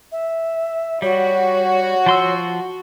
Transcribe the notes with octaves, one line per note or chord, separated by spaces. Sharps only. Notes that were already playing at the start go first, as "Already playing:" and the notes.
E5
G3 F#4 C#5
F3 C6 E6